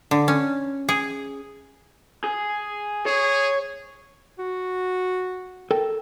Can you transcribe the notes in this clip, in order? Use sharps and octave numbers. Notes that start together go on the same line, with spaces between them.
D3
C#4
G#4
G#4
G#4 C#5
F#4
A4 A#4 G5